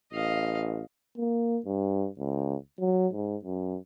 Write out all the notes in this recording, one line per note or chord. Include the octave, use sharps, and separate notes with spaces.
A1 D#5 F5
A#3
G2
C#2
F#3
G#2
F#2